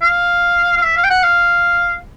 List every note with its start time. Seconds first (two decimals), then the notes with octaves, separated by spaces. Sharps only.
0.02 F5
0.77 F5
0.83 E5
0.97 F5
1.04 G5
1.10 F#5
1.23 F5